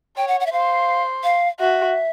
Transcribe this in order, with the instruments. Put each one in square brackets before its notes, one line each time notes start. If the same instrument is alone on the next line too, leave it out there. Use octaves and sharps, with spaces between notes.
[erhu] C#5 [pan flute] G5
[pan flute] F#5
F#5
E5
[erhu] C5 [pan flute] F5
[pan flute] F5
[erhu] F#4 [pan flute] E5